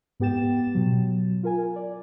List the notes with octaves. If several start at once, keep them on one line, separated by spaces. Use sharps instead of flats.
G#2 B3 G4 G5 A6 E7
B2 F#3
F4 A#4 G#5
D5